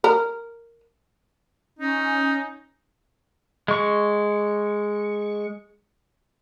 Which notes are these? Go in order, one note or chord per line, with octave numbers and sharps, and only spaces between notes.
A#4
C#4 D#4
G#3 C#6